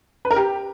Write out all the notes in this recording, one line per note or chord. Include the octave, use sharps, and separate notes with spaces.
B4
A#4
G4